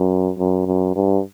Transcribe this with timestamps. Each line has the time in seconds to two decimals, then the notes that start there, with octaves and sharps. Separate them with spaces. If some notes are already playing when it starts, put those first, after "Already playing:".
Already playing: F#2
0.38 F#2
0.66 F#2
0.95 G2